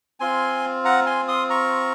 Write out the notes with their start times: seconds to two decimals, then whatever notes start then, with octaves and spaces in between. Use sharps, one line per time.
0.20 C4 F4 G#5 C6
0.85 F#5 A#5
1.06 G#5 C6
1.28 C6 D#6
1.50 A#5 C#6